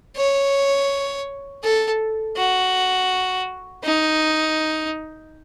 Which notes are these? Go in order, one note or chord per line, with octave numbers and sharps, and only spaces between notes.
C#5
A4
F#4
D#4